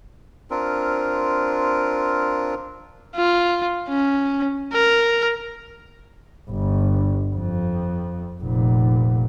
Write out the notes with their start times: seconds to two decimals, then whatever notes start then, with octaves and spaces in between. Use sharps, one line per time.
0.51 C4 D4 F4 A#4
3.16 F4
3.89 C#4
4.73 A#4
6.50 G1
7.36 F2
8.42 F1 A#2